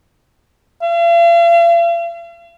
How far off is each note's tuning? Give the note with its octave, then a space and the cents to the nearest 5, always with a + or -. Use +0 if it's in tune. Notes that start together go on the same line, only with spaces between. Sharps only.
F5 -45